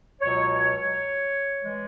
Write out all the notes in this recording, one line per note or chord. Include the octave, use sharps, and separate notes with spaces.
C#2 B2 F#3 C#5
C#5
E3 G#3